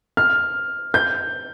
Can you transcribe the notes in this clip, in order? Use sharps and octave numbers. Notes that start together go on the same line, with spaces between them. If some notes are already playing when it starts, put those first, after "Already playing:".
F6
G6